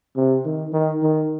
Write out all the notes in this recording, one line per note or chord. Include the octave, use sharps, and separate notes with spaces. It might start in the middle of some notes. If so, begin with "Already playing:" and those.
C3
D#3
D#3
D#3